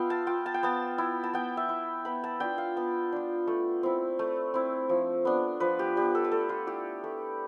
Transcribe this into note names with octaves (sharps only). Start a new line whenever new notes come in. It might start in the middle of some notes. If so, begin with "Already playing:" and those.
Already playing: B3 F4 E5 F5 G5
A5
F4 G5
A5
G5
B3 A5
E4
A5
B3 G5
E5
E4
B3 B5
A5
D4 F4 G5
F5
B3 A5
D4 F4
A3
C4 E4
A3
C4 E4
F3
B3 D4
F3 B4
G4
B3 D4 G4
A4
B4
A3 A4
F4
E4 G4
A3